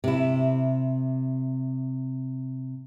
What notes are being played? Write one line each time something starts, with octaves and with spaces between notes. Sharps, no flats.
C3 E4